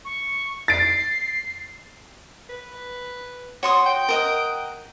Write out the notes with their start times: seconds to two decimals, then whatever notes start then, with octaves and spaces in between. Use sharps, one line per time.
0.05 C#6
0.68 A6 C7 D7
2.50 B4
3.63 F#4 C#5 C6 D#6
3.86 G5
4.09 A#4 D#5 F#5